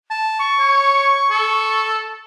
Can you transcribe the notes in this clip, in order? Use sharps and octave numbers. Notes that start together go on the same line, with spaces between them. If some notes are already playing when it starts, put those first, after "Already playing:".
A5
C#6
C#5
A4